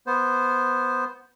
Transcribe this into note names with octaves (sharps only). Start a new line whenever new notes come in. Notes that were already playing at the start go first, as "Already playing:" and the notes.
B3 C5